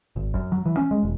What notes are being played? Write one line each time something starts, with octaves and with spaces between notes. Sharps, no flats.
G#1
F#2
F#3
E3
C#4
G#3
E1